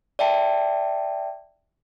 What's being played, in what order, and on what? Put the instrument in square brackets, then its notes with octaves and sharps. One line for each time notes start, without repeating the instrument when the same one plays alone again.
[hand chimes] D5 E5 G5 A5